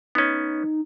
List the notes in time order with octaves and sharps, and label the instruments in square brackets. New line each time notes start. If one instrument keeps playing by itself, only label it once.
[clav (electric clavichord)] B3 C#4 [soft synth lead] D#4